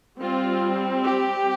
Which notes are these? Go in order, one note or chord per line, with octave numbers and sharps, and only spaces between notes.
G3 C4 F4
G4